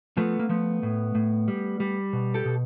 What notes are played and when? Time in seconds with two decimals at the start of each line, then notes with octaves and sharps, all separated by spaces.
0.17 F3 A3 B3
0.39 A#3
0.49 F3 A3 B3
0.83 A2
1.15 A2
1.48 G3
1.80 G3
2.13 B2
2.34 G4 A4
2.45 B2